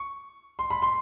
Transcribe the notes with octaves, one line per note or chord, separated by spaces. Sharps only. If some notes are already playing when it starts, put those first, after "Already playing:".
Already playing: C#6
C6
B5
C6